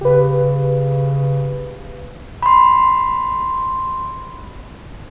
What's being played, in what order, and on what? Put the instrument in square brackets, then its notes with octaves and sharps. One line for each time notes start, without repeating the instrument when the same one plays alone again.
[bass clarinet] C#3 [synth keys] G4 B4
[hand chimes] B5 C6